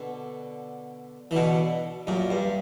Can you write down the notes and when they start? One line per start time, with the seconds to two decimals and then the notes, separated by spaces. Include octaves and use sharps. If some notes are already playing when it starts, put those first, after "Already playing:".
Already playing: B2 D3
1.31 E3
1.35 B2 D3
2.07 F#2 A#2
2.30 G2